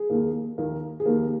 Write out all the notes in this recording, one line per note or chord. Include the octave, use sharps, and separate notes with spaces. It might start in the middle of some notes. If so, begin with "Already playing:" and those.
Already playing: G#4
D#2 D#3 A#3
D#2 D#3 A#3
G#4
D#2 D#3 A#3 G4